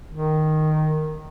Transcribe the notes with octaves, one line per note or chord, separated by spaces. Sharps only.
D#3